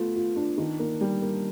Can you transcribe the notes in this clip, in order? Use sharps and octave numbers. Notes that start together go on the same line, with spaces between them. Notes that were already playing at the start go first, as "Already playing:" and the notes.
Already playing: A3 B3 F4
F4
D4
D#3
A#3
G3
A#3